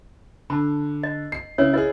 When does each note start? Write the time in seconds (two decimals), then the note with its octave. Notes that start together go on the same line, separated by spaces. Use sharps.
0.50 D3 A5 B5
1.03 D#5
1.32 C7
1.58 C#3 E4 B4 C#5
1.73 E4 G#4 B4 D#5